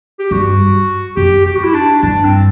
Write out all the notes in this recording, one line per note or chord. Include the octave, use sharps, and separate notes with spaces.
G4
G2 F#4
F#2 G4
G4
F#4
E4
D4
G2 D4
C4